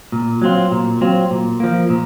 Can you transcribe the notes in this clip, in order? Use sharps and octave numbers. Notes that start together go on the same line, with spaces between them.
A#2
F#3 C4 F4
A#2
F#3 C4 F4
A#2
F3 A#3
A#2